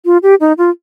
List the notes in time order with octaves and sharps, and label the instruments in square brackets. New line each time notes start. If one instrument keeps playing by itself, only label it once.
[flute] F4
G4
D#4
F4